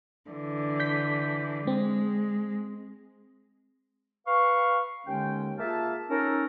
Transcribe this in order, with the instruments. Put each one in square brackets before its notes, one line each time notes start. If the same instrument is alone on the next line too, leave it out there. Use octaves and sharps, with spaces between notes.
[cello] D3 E3
[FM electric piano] G6 B6
[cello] G#3 [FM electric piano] C4
[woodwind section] B4 F5 C#6
D#2 D3 G#3 C#4 G5
A#3 F4 G#4 E5 F5 A5
C#4 D#4 A4 A#4